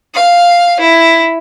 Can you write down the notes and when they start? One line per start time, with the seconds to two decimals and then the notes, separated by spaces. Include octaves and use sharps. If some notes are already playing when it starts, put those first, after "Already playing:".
0.14 F5
0.80 E4